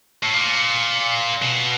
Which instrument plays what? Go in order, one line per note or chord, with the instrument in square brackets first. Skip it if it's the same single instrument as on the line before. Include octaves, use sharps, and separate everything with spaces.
[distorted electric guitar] A2
A#2
B2